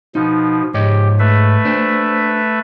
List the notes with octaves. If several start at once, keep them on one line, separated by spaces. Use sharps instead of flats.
B2 F3 D#4
G#2 G4 C#5 D#5
A3 B4 E5
D4 C5